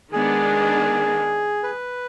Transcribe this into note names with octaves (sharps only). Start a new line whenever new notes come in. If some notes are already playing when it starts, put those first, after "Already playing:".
D#3 G#3 B3 D4 G#4
B4